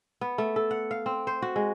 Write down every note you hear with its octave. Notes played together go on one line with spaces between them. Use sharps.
B3
A3
A4
F#5
F5
C4
C5
F#4
G#3